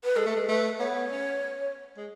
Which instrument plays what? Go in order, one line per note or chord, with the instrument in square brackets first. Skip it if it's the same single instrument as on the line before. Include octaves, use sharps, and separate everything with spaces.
[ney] B4
[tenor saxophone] G#3 [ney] A4
[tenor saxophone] A3
G#3
[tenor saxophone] A3 [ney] B4
[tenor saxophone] B3 [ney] C#5
[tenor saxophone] C#4
G#3